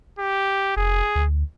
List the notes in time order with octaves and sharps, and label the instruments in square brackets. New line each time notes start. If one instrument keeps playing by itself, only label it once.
[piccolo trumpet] G4
[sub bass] F1 [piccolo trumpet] G#4
[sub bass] D2